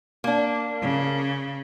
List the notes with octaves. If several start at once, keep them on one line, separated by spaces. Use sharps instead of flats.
A#3 D4
C#3